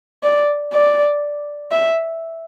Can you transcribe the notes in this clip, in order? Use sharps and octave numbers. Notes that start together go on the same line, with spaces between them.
D5
D5
E5